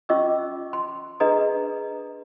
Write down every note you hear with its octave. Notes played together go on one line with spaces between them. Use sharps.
C#4 F4 D#5 C#6 D6 E6
C6
D4 G#4 B4 D#5 A#5 D#6